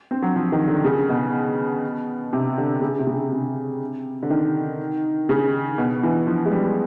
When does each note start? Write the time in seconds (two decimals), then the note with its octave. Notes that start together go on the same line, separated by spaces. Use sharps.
0.11 C4
0.22 F#3
0.36 F3
0.52 D#3
0.68 D3
0.84 C#3
1.09 B2
2.33 C3
2.58 D3
2.81 C#3
2.99 C3
3.07 C#3
3.32 C3
4.23 D3
4.30 D#3
5.29 C#3
5.78 B2
6.03 E3
6.27 F3
6.46 G#3
6.52 G3